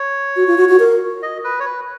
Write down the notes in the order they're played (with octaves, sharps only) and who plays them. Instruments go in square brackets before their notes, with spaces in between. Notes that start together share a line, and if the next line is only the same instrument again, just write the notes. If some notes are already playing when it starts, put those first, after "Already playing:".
Already playing: [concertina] C#5
[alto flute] F#4
F4
F#4
F#4
A#4
[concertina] D#5
B4
C#5
B4